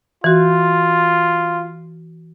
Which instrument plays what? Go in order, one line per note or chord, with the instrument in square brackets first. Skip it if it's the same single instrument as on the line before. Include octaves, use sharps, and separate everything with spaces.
[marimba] E3 F#4 [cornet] F4